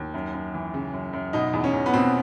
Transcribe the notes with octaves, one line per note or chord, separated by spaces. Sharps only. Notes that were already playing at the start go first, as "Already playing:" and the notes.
Already playing: D#2
F#2
F#2
E3
C#3
F#2
F#2
B2 D#4
E2
C#4
E2
B3
B2 C4